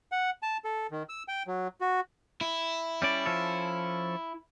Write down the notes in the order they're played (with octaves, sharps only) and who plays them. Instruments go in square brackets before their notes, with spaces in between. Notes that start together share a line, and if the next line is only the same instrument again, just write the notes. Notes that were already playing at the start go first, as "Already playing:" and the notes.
[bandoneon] F#5
A5
A4
D#3
E6
G5
F#3
F#4
[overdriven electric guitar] E4
[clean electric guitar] G3 C#4 D5
F3 C#4 A4